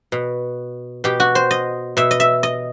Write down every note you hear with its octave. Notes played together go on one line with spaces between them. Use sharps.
B2
B2 G4
F#4
C5
D#5
B2 E5
D#5
E5
D#5